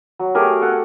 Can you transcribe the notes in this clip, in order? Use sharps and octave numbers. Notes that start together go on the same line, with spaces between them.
F#3
A3 G4 G#4 A#4
A4 F#5